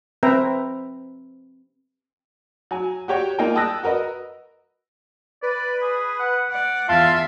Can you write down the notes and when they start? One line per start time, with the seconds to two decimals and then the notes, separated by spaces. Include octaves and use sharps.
0.23 C4 B4 E5 G5 A#5
2.71 F#3 G#5
3.08 F#4 G4 C#5 G5
3.38 A#3 D#4 F4 A#4 G5 G#5
3.55 G5 A5 D#6 E6 F#6 A#6
3.83 F#4 A#4 B4 D#5
5.43 B4 D5
5.82 G#4
6.19 F#5
6.51 D5 F#5
6.89 E2 F4 E5 F5 A5 C6 C7